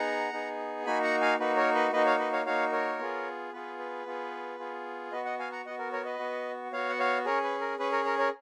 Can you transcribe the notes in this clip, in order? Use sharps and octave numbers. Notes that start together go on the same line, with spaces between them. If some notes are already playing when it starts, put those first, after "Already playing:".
Already playing: B3 D#4 G#4 F#5 A#5
B3 D#4 G#4
A#3 D#4 F#4 G#5 B5
F#5 A#5
F5 G#5
A#3 D#4 F#4 B4
A#4 C#5
B4 D#5
A#3 D#4 F#4 B4 D#5
C#5 F5
B4 D#5
C#5 F5
A#3 D#4 F#4 C#5 F5
A#4 C#5
B3 F4 G#4
B3 F4 G#4 B4
B4
B3 F4 G#4
B3 F4 G#4
B3 F#4 B4 D#5
D#5 F#5
F5 G#5
F#5 A#5
B3 F#4 D#5 F#5
A#4
A#4 C#5
B4 D#5
B3 F#4
B3 F#4 C#5 F5
F#5
C#5 F5
C#4 G#4 A#4 C#5
B4
A#4
C#4 G#4 B4
A#4 C#5
A#4 C#5
A#4 C#5